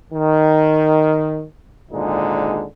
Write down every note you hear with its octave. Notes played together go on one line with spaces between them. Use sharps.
D#3
G#1 A#2 D3 G#3 D#4